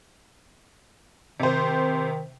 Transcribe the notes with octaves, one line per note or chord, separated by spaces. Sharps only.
C3 D#3 C5